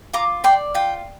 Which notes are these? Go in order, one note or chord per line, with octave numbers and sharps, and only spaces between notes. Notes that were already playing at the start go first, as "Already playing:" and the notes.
F4 A#5 D6
D5 G5 C6
F4 G5